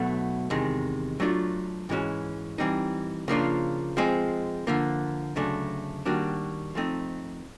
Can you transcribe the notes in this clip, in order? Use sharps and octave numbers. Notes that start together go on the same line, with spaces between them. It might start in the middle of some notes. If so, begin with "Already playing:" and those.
Already playing: B1 B2 F#3 A3
E2 C3 D#3 G#3
F#3 A3 D4 F4
G#2 E3 G#3 C#4 F#4
E3 G3 C4 D#4
C#3 F3 A#3 D4 F4
F3 G#3 C4
D3 F3 A#3
D2 C#3 F#3 A3 D4
D#3 G3 A#3 D4 F#4
F3 A3 C4 D#4